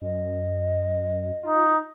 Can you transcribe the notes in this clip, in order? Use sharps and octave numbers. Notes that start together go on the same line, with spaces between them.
F#2 D#5
D#4 F4